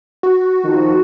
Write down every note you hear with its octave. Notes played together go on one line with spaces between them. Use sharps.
F#4
D#3 F3